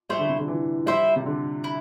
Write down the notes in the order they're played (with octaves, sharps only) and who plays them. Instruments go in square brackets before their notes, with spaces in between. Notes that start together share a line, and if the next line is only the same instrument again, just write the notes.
[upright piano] G3 [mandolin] A3 E4 C5
[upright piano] D3
C3
D3
E3
[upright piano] G3 [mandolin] E4 C5 E5
[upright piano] C3
D3
[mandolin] E4